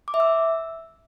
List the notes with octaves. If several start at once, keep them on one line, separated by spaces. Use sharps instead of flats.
D6
E5
E6